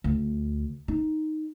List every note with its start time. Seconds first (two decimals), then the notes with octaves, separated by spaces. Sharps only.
0.04 D2
0.88 D#4